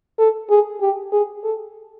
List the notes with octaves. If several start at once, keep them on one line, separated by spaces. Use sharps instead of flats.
A4
G#4
G4
G#4
A4